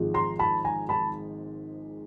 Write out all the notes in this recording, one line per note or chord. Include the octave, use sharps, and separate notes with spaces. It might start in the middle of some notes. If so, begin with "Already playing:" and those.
Already playing: G#1 G#2 F3 G#3
A#5 C6
A5 B5
G#5 A#5
A5 B5